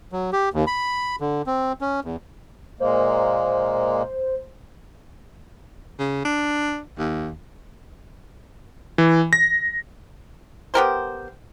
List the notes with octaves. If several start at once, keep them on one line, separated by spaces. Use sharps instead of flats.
F#3
G4
D#2
B5
D3
C4
C#4
E2
A#2 G#3 A#3 C5
C#3
D4
D#2
E3
A#6
B3 G4 A#4 C5